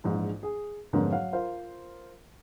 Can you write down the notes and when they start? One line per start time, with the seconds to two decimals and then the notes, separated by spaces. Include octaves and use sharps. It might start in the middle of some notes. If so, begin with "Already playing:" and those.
0.04 A#1 G#2 E3
0.43 G#4
0.93 F2 G#2 D3 A#3 B3 C#4
1.12 F#3 F5 F#5
1.33 F4 A#4 C5 F5